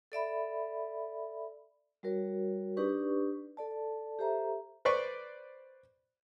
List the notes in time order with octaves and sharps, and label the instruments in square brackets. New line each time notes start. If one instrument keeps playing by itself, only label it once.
[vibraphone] A4 D5 E5 B5
G3 F#4 A#4 C#5
D4 D#4 G4 B4 D5 C#6
A4 D5 A5
G4 A4 C5 E5 A#5
[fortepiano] B4 C5 D5 C#6